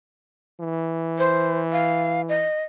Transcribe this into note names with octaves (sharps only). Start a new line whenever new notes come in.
E3
C5
F5
D#5